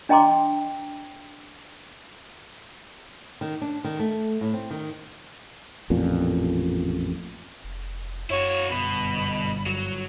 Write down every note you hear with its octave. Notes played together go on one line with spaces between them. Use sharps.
D4 D#5 G5 A#5 C6 D6
D#3
D4
D#3
A3
A2
C4
D#3
A1 F2 A#2
F1
F#2 E4 F#4 C#5
G1 B2 B5
G2 F#3